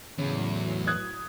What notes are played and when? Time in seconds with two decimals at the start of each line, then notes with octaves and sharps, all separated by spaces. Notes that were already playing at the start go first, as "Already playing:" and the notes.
0.18 E2 A2 C#3 F#3
0.87 D#6 F#6 G#6